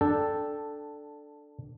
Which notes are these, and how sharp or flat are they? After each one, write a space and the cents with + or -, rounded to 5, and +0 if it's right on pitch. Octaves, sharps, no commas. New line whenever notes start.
D4 +5 A4 +0 G5 +0